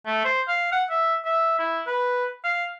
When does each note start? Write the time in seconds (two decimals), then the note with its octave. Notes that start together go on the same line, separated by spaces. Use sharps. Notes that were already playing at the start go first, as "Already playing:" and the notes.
0.06 A3
0.25 C5
0.48 F5
0.72 F#5
0.90 E5
1.25 E5
1.59 E4
1.87 B4
2.44 F5